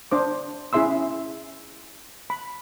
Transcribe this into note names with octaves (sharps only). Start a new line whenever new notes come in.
D4 C5 D6
C#4 E4 G#4 E5 C6 E6
B5